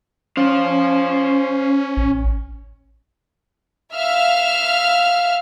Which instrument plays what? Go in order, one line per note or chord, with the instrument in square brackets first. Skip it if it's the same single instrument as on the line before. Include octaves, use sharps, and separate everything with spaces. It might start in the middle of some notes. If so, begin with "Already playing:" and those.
[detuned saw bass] C#4 [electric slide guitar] C5 F5
[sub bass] A1
[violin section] E5 F5 F6